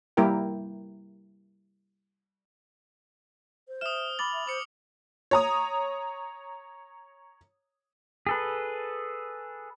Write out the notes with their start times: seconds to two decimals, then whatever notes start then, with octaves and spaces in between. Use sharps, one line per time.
0.17 G3 A#3 E4 A#4 G5
3.68 C5
3.81 E5 D#6 F6 E7
4.19 B5 D6 A6 F#7
4.33 E5
4.47 C5 D6 C#7
5.31 C#5 A#5 D#6
8.27 G#4 A4 B4